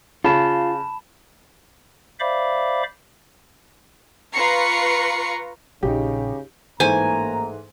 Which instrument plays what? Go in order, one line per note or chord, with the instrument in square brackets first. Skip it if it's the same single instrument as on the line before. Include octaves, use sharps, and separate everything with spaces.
[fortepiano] C#3 [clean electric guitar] F4 [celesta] A5 B5 E7
[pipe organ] C5 D5 E5 F5 B5 D6
[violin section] F4 B4 A#5 C#6 C7 C#7
[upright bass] A#1 [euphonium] C#3 [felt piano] D#4 G4
[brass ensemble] A1 A#3 A#5 [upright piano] G#2 E3 A3 [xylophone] C5 [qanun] G#5